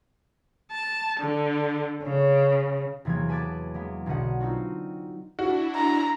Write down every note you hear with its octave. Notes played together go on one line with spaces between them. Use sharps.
A5
D3
C#3
E2 C3 E3 F#3 A#3 G#6
B4 G#5 A5 D6 F#6 A6
G#3 A#3 B3
B1 B2 D3 D#5 F#5
C4 D#4 F4 F#4
D4 E4 F#4
A#5